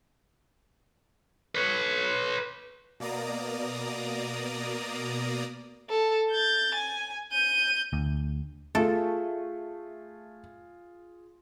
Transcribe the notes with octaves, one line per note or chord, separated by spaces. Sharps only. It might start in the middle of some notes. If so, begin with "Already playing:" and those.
B4 C#5
B2 A#3 D5 A#5 D#6
A4
G6 A6
G#5
G6 D#7
D2
A3 F4 G#4 A4